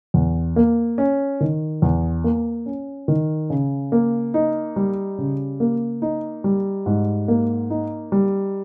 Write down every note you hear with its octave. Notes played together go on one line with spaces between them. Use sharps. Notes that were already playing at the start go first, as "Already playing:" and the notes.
E2
A#3
C#4
D#3
E2
A#3
C#4
D#3
C#3
A#3
D#4
G3
C#3
A#3
D#4
G3
G#2
A#3
D#4
G3